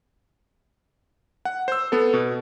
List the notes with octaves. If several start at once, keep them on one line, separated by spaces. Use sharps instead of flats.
F#5
C5 E6
B3 A4
B2